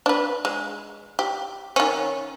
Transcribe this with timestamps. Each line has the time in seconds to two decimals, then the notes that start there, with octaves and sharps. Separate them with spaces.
0.06 D4 B4
0.45 G#3
1.19 G4
1.76 D#3 C#4